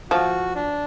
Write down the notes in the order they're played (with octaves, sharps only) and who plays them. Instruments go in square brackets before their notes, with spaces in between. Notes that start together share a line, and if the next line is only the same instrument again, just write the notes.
[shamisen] F3 [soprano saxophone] F#4
[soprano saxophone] D4